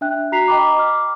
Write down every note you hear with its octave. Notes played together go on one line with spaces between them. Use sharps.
D4 E5 G5 F#6
F#4 A#5 F#6 B6 C7 F7
D#5 G5 A#5 B5 D6
D6 F6